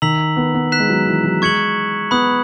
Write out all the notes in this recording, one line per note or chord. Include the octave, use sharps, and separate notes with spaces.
D#3 A#5 E6 B6 F#7
B3
B3
F#6 B6 E7
G#3
F#3
E3
F#3
G#3 C#6 G#6 C#7 F#7
B3 B5 D#6 F#6